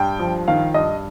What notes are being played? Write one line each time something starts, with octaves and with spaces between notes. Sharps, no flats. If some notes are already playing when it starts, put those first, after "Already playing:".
Already playing: G2 G5
F3
D#3 F5
G2 D#5